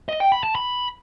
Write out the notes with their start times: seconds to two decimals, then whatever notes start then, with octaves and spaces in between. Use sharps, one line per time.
0.09 D#5
0.20 G5
0.32 B5
0.44 A5
0.55 B5